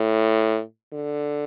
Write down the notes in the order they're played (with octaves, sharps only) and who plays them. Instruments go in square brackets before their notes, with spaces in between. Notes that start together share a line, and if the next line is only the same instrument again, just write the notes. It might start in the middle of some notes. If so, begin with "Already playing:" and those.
Already playing: [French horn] A2
D3